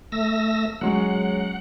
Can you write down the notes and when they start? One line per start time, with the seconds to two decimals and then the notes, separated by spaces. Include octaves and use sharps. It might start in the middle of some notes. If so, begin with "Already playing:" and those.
0.12 A3 E6 A#6
0.81 F#3 G#3 C#4 F#5